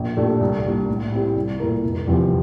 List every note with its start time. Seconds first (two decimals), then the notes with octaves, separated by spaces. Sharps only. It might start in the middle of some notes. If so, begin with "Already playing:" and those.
Already playing: A#1
0.17 A#2 A3 D4 G4
0.41 C2
0.64 A#2 G3 D4
0.89 A2
1.12 G3 C4 E4
1.36 C2
1.60 A#2 A3 E4 A#4
1.83 F1
2.07 E2 C3 F3